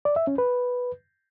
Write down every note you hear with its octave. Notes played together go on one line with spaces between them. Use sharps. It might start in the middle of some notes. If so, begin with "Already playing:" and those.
D5
E5
C#4
B4